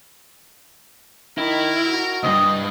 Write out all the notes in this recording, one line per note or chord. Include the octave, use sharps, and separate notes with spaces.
D#3 E4 A#4
F#4
D2 G2 D#5